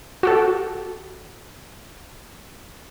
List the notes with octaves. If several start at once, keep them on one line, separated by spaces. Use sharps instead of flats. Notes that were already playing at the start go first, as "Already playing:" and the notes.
F#4 G4 A4